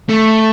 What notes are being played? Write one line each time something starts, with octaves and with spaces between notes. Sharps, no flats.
A3